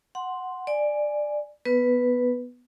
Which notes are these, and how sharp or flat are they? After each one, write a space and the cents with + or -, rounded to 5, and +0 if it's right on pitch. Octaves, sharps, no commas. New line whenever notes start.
F#5 +0 C6 +0
D5 +10 G#5 +0
B3 +0 B4 +0